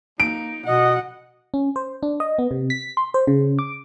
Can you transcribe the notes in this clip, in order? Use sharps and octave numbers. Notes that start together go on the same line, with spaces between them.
A#3 D#4 D7
B2 D#5 F#5
C#4
C5
D4
D#5
B3
C3
B6
C6
C5
C#3
D6